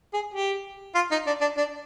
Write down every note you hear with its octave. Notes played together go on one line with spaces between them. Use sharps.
G#4
G4
F4
D#4
D4
D4
D4